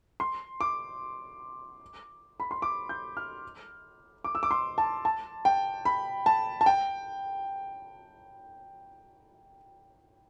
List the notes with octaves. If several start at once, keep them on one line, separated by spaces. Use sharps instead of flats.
C6
D6
B5
C6
D6
G6
F6
D6
E6
D6
C6
A5
A5
G5
B5
A5
A5
G5